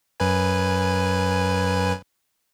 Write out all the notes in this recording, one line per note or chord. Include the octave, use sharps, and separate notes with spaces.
F#2 B4 G#5